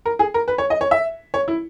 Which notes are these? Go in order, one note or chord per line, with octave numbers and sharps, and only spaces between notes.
A#4
G#4
A#4
B4
C#5
D#5
C#5
E5
C#5
E4